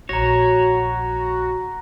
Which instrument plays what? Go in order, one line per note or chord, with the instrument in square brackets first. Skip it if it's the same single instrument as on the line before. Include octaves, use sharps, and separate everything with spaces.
[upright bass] A#1 [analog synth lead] F#4 [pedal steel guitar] C#5 [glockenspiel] A#5 A#6